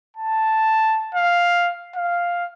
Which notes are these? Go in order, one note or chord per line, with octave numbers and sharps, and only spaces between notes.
A5
F5
F5